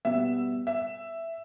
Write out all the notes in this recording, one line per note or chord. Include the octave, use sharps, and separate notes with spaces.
B2 G3 B3 E5
E5